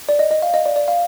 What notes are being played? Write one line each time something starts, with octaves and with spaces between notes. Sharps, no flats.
D5
D#5
D#5
F5
D#5
D5
D5
F5